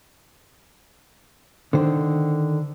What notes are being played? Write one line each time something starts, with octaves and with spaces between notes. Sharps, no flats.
D3 D#3 C5